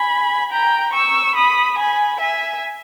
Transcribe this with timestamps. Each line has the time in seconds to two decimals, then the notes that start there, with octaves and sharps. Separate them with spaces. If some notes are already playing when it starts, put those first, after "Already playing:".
Already playing: G#5 B5
0.51 G5 A#5
0.94 C#6 E6
1.35 B5 D#6
1.78 G#5 B5
2.19 E5 G#5